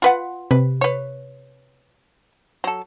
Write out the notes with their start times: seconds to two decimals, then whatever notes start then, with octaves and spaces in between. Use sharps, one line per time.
0.02 F4 B4 F#5
0.51 C3 B4
0.81 B4 C#5
2.64 F#3 A4